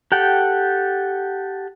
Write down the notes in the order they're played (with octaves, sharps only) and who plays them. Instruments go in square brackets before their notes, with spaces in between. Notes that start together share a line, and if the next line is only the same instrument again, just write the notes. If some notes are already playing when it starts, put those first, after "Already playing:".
[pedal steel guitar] G4 A4 F#5 G5